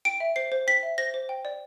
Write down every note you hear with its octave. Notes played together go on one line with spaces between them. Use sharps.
G5 D7
E5
C5 C7
C5
G5 B6
E5
C5 A#6
C5
G5
D5